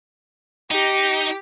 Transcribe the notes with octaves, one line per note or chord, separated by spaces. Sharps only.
D#4 G4